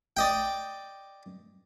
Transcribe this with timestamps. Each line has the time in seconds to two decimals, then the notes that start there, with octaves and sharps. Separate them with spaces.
0.17 D5 D#5 G5